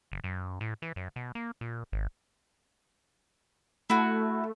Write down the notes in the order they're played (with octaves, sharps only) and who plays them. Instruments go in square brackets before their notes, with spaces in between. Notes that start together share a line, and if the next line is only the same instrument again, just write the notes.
[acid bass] F#1
F#2
A2
E3
F#2
B2
A#3
A#2
G#1
[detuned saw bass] A3 [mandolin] E4 F#4